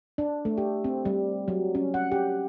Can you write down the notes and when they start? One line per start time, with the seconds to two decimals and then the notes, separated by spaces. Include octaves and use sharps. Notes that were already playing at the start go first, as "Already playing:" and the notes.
0.18 D4
0.45 A3
0.58 G4
0.84 C4
1.05 G3
1.48 F#3
1.75 C#4
1.94 F#5
2.12 G4